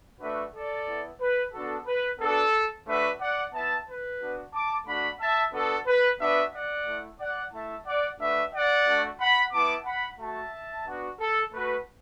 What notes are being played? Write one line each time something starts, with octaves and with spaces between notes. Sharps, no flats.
A3 D4 F#4 B4 E5
A4 D5
B3 E4
B4
B3 D4 F#4 A4
B4
B3 D4 F#4 A4
A3 D4 F#4 B4 E5
D5 F#5
B3 E4 E5 A5
B4
B3 D4 F#4
A5 D6
A3 D4 F#4 F#5 B5
E5 A5
B3 D4 F#4 A4
B4
B3 D4 F#4 B4 E5
D5 F#5
A3 E4
D5 F#5
A3 E4 E5 A5
D5 F#5
A3 D4 F#4 B4 E5
D5 F#5
A3 D4 F#4
F#5 B5
B3 E4 A5 D6
F#5 B5
A3 F#4 E5 A5
B3 D4 F#4
A4
A3 F#4 B4